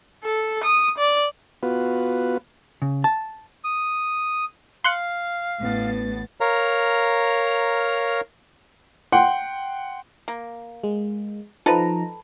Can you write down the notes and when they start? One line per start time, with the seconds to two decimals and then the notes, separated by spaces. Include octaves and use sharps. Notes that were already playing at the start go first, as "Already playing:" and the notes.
0.24 A4
0.64 D#6
0.98 D5
1.63 B3 F4 F#4 B4
2.82 C#3
3.04 A5
3.64 D#6
4.84 F5 C6 F#6 C#7
5.60 A1 A2 B3 A6
6.41 A#4 C#5 F5 A#5
9.12 F#5 G5 C6
10.28 A#3
10.84 G#3
11.66 F3 D#4 A4 B4 A#5